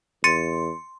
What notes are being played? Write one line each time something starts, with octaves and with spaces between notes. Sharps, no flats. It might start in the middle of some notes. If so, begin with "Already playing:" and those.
E2 C6 A6 C#7 D#7